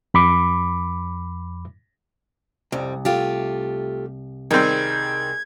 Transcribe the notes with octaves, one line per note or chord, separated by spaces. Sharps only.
F2 B5 D6
C2 F2 G3
A3 F4 G4
D#3 G3 C4 G#4 G#6